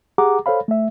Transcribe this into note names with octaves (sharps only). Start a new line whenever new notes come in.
G4 G#4 F#5 A#5 D6
A4 C5 C#5 F5 B5
A3 E5